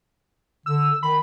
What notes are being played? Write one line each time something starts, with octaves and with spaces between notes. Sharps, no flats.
D3 E6
D#3 B5